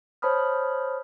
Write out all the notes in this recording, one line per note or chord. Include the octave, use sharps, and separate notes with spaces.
C5 C#5 A5 B5 D#6 F6